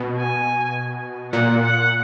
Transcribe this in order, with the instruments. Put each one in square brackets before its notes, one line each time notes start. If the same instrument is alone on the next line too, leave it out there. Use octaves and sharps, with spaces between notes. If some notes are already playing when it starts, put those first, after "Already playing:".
Already playing: [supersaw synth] B2
[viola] G#5
[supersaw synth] A#2 [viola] F#5
[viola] F#5